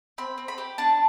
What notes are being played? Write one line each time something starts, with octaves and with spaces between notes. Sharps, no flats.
C4 B5
C4
B5
G4
D4 A5